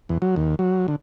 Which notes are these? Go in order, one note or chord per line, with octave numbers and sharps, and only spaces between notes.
E2
F#3
D#2
F#3
D3